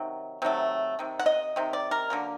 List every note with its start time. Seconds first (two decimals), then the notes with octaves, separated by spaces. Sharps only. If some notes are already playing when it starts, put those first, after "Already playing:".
Already playing: C3 D#3 F#3
0.42 C3 D#3 F#3 A3
0.99 C3 D#3
1.19 F#5
1.26 D#5
1.56 C3 D#3
1.73 D5
1.91 A#4
2.10 D3 F#3 A#3